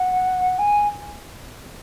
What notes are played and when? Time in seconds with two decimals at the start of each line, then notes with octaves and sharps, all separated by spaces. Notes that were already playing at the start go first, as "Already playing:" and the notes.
Already playing: F#5
0.59 G#5